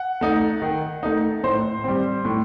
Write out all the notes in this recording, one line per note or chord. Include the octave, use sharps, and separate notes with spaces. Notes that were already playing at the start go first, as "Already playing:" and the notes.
Already playing: F#5
A3 D#4
D#3
A3 D#4
A2 C5
G3 C4
A2